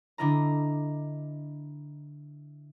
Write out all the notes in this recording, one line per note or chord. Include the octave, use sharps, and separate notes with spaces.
D3 D4 E4 D#5 A#5